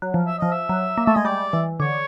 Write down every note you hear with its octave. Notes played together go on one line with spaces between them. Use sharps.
F#3
F3
E5
F3 D#5
E5
F#3
A#3
A3 E5
G#3 D#5
G3 D5
E3
D3 C#5